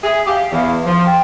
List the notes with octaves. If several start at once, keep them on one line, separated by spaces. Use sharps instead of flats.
G#4 E5
G4 F5
E2
F3 C6
G5